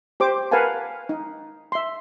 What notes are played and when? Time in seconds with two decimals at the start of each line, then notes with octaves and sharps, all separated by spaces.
0.20 G4 C5 D6
0.51 A#4 B4 F5 F#5 G#5 A5
1.09 D#4
1.72 E5 C6